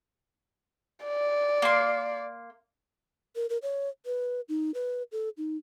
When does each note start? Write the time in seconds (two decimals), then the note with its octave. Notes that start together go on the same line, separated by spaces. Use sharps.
1.05 D5
1.62 A#3 C6
3.35 A#4
3.49 A#4
3.62 C#5
4.06 B4
4.49 D#4
4.74 B4
5.12 A4
5.37 D#4